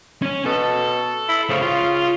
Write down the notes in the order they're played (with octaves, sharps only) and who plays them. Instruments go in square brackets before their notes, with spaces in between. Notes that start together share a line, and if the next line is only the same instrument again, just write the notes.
[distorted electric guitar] C#4 C#5
[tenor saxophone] B2 [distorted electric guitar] A4
[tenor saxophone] E4
[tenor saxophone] C#3 [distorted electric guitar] A3 C4
[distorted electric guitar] F4